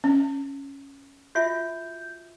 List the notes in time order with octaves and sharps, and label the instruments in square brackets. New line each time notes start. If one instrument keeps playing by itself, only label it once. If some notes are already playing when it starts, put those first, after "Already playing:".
[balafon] C#4
[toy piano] F4 F#4 E5 [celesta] G6